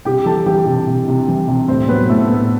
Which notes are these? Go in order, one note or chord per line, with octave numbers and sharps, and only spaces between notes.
C3 G4 G5
E3 A4 A5
E3 G4 G5
C3
C3
C3
E3
C3
A2 C4 C5
F#3 B3 B4
A2 A3 A4
B3